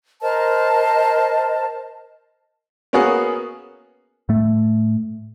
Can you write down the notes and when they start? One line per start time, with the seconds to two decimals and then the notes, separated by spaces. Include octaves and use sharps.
0.21 A#4 C5 D#5 A5
2.93 A#3 B3 C#4 F#4 G#4
4.29 A2 A3